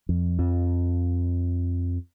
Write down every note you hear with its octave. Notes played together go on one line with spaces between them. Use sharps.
F2
F2